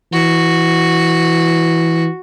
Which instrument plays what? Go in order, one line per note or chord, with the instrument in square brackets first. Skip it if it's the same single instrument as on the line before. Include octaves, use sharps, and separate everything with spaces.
[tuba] E3 [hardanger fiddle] F#4